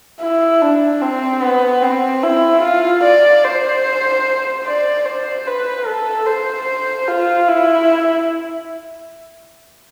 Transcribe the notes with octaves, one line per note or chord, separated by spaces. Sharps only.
E4
D4
C4
B3
C4
E4
F4
D5
C5
D5
C5
B4
A4
C5
F4
E4